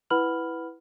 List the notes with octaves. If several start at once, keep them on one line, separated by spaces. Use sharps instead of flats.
E4 B4 F#5 B5 F6 F#7